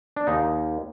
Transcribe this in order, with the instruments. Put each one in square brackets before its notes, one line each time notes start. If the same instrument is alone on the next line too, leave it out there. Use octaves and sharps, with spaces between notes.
[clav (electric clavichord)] D4
D#2 D#4